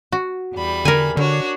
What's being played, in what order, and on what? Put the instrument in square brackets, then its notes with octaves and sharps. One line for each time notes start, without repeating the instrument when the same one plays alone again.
[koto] F#4
[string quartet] E2 G3 B5
[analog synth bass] D3 [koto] A#4 G#5
[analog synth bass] D3 [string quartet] D4 F#4 C#5